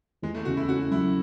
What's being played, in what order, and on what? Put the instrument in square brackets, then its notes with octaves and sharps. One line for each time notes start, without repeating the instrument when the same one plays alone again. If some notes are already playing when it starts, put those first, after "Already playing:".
[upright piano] E2 [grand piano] G#3
[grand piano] A3
[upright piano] C#3 [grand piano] F#4
[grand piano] E4
[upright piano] C#4 [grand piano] F#4
[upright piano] F#3 [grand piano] E4